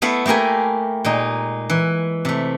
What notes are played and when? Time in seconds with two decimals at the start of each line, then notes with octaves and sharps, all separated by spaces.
0.02 A3 B3 E4 F5
0.26 A3 A#3 G4 A#4 G#5
1.05 A#2 G#3 D#4
1.70 E3
2.25 C3 A3